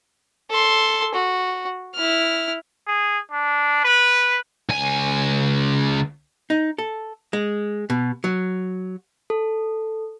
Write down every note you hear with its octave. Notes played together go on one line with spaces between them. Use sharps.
A4 C6
F#4
E4 F6
G#4
D4
B4
C#2 G#5
D#4
A4
G#3
B2
F#3
A4